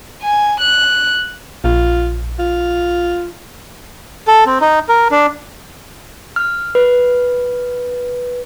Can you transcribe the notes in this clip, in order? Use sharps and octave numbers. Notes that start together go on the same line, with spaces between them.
G#5
F#6
A#1 F4
F4
A4
C4
D#4
A#4
D4
F6
B4